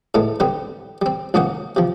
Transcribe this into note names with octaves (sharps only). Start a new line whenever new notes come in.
A2 G#3 A3 B3
D3 G3 B3 C4
G3 C4
C#2 G#2 A#3 C#4 D#4 F#5
C3 F3